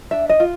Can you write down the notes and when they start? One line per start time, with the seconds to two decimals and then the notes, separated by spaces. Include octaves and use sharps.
0.11 D4 E5
0.29 D#5
0.40 F4